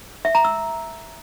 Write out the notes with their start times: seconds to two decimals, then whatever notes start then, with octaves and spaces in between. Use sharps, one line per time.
0.25 E5
0.35 A#5
0.45 E6